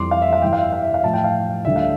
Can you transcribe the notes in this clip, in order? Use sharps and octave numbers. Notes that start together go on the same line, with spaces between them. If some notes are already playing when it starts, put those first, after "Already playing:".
Already playing: F2 E3 G3 C6 D6
F5
E5
F5
G2 E3 G3 G5
F5
E5
F5
E5
F5
A2 F3 A5
G5
F5
D2 D3 G3 E5
F5